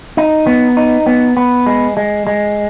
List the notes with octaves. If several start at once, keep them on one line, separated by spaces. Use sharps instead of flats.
D#4
B3
D#4
B3
B3
G#3
G#3
G#3